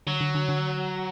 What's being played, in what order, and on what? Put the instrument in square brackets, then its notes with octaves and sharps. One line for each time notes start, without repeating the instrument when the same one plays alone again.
[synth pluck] D3 [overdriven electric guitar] F#3
[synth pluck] D3
D3
D3